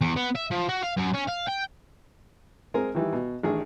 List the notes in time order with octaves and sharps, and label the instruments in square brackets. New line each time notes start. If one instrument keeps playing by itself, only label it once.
[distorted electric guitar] E2
B3
E5
F3
F#4
F5
F#2
C#4
F5
G5
[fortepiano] G#3 C4 G#4 A#4 G#5 A#5
D#3 E3 G3 E4
B2
A1 D#3 D4 G#4